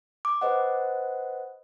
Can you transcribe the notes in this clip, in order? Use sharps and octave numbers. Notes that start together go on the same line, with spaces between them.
D6
B4 C5 D#5 F#5